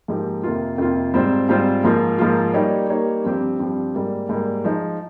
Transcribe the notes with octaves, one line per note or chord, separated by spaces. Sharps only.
G#2 F3 A#3 D#4 G4
F2 C3 D#3 A#3 F4
F2 C3 D#3 A#3 F4
G#2 G3 C4 F4 C5
G#2 G3 C4 F4 C5
G#2 F3 A#3 F4
G#2 F3 A#3 F4
G3 A#3 D#4 G4 C#5
G3 A#3 D#4 G4 C#5
G2 F3 C4 G4
G2 F3 C4 G4
G#2 G3 A#3
G#2 G3 A#3
F3 G#3 D#4